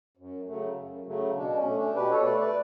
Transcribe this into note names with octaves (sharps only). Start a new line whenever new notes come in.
F#2
C#3 F#3 A3
F#2
C#3 F#3 A3
B2 D4
C#4
A3
D4
B2 G4 B4
A4 C#5
A3 B4 D5
B4 D5